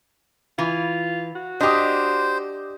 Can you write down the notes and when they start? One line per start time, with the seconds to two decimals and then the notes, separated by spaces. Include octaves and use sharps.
0.59 E3 F4
1.36 F#4
1.61 D4 G4 C5 D#5 D6 D#6